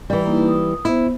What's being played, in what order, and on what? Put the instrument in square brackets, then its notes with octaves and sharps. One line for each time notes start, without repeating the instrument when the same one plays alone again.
[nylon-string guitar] E3 G3
[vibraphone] A#3 D#4 E4
D#6
[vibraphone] B3 C5 [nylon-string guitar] E4